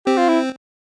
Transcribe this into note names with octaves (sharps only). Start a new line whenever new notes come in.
C4 G4
F4
E4